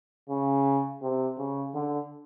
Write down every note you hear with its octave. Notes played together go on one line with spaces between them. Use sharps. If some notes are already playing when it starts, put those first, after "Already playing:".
C#3
C3
C#3
D3